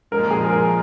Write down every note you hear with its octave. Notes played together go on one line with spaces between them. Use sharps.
A#2 F3 G#3 A#4
G#4
A#4